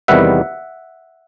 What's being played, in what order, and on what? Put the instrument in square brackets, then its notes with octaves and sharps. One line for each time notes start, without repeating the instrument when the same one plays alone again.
[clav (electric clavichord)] E2 C3 D#3 G3 B3 E5 F#5